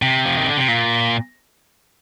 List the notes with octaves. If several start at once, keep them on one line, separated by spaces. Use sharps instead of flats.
C3
F3
D#3
D3
C3
A#2